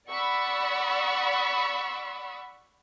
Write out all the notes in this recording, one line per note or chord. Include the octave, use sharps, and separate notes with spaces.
D5 F#5 B5 C#6 E6